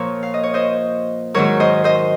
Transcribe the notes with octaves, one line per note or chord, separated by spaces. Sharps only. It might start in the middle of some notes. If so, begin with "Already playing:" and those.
Already playing: A#2 F3 A#4 C#5
F5
D#5
C#5
C5 D#5
G#2 D#3 F#3 A#4 C#5
C5 D#5
C5 D#5